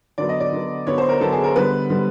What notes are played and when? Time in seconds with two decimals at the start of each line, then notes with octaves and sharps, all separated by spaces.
0.18 D3 F#3 B3 D5
0.29 D#5
0.40 D5
0.53 D3 F#3 B3
0.87 D3 F#3 B3 C#5
0.98 C5
1.09 A#4
1.21 D3 F#3 B3 A4
1.32 G#4
1.44 A#4
1.55 D3 G3 B3 B4
1.90 D3 G3 B3